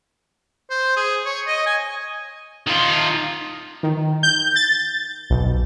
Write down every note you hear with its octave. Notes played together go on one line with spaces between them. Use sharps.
C5
G#4
C#5
D#5
G#5
D#3 F4
D#3
G6
A6
B1